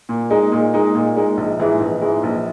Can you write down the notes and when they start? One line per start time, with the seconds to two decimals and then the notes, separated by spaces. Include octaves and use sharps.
0.09 A#2
0.30 G#3 D#4
0.52 A#2
0.74 G#3 D#4
0.95 A#2
1.16 G#3 D#4
1.37 A#1
1.59 G#2 E3 G#3
1.80 A#1
2.01 G#2 E3 G#3
2.23 A#1